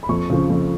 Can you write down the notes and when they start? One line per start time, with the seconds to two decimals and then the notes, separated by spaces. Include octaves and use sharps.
0.03 B5
0.09 F2 C#6
0.30 C#3 F3
0.50 F2